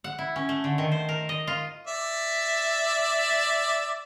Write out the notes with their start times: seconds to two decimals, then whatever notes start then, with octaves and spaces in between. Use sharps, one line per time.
0.04 F#5
0.19 E4
0.36 C#4
0.49 A3
0.64 D3
0.78 D#3
0.92 C5
1.09 A#4
1.29 D#5
1.47 F4
1.87 D5 E5